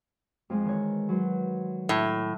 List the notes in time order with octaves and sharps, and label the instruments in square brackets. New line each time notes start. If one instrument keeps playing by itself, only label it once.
[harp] F2 F3 G#3
D#3 E3 C#5
F#3 B4 C5
[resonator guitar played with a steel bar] A2